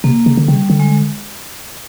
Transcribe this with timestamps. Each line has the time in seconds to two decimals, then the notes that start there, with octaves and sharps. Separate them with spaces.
0.04 C3 A#3
0.26 C#3
0.37 D3
0.48 C#3 G3
0.70 D3
0.80 G#3